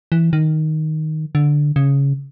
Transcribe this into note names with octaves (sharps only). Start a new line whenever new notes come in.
E3
D#3
D3
C#3